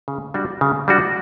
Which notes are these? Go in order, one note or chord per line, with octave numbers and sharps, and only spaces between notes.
C#3
G3 D4 F#4
C#3
G3 D4 F#4